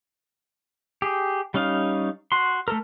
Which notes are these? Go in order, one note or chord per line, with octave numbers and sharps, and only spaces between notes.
G4 G#4
G3 C#4 D#4 F5
F#4 C6
A3 A4 A#4